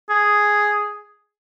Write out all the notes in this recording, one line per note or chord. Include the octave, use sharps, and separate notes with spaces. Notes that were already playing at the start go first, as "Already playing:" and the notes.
G#4